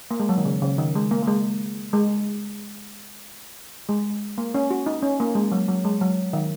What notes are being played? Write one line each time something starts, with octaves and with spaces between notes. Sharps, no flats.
A#3
G#3
F#3
D#3
C#3
C#3
D#3
G#3
A#3
A#3
G#3
G#3
G#3
A#3
C#4
F#4
D#4
C#4
A#3
G#3
F#3
F#3
G#3
F#3
D#3